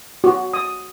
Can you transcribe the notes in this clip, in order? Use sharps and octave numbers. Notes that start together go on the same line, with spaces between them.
F#4
D#6